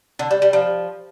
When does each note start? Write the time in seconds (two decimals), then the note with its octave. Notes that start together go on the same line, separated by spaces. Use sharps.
0.19 D3
0.31 G3
0.42 G3
0.53 F3